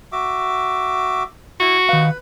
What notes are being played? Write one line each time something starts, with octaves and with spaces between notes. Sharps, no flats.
F#4 E5 D6
E4 F#4
D#3 B4 F5